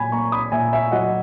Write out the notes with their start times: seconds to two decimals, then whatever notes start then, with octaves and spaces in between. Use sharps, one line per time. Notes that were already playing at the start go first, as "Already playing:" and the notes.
Already playing: A#2 F#3 G#5 B5
0.12 A#3 A#5 C#6
0.32 B5 D#6
0.52 A#2 E5 G#5
0.73 E5 G#5
0.92 F#3 D#5 F#5